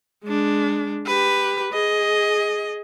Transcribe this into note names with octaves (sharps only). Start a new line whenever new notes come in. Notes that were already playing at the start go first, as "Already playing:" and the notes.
G#3 D4
G4 B4
G#4 D#5